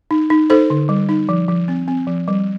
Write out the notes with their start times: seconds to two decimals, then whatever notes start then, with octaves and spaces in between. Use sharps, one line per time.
0.11 D#4
0.30 D#4
0.50 D#4 A4 C5
0.70 D3
0.89 G3
1.09 D#4
1.29 F3
1.48 F3
1.68 C4
1.88 C4
2.07 F3
2.28 G3